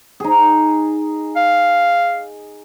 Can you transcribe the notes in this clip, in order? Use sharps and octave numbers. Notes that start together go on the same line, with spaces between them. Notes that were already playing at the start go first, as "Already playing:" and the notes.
D#4 G#4
F5